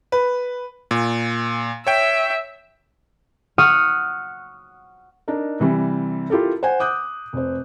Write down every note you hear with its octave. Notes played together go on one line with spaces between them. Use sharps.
B4
A#2
C#5 E5 G5
F#5 C#6 D#6 F6
D4 D#4 A#4
C3 E3 G3
E4 F4 G4 A4 A#4
C5 F#5 G#5
D6 D#6 F#6 G6
F1 C5